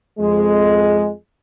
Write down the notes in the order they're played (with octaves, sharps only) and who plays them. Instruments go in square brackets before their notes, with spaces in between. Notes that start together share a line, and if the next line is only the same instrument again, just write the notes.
[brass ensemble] F2 G#3